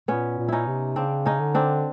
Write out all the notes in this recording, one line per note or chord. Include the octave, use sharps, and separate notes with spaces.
A#2 B3 C#4
A#2
C#4 D#4 E4
C3
C#3 C4 D4
C#4 D#4
D3
C4 D4